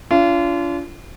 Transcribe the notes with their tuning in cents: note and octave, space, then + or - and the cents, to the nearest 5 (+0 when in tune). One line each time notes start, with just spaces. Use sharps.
D4 -40 F4 -30